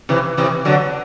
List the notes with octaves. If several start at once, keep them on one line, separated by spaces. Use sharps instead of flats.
C3 E3
C3 E3
D3 F#3